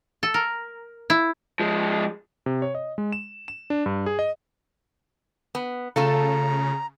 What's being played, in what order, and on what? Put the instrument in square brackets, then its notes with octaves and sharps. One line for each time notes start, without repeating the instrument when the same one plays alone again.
[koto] A4
A#4
E4
[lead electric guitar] F3 G#3
[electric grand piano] C3
C#5
D#5
G#3
E7
E7
D4
G2
G#4
D#5
[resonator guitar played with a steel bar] B3
[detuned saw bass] C#3 [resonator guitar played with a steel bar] A3 F4 A4 [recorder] A#5